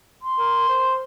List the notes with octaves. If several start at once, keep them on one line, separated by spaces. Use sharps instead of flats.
C6
A#4
C5